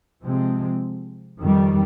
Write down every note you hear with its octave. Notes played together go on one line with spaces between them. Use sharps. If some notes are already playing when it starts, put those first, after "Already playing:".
C3 F3 G#3 C4
F2 D#3 G3